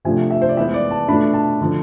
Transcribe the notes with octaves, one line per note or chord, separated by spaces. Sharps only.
C3 F3 A3 D4 F4 G#5
E5
C5
D5
E3 G#3 B3 E5
D5
A5
B2 A3 D4 F4 B5
A5
D3 F3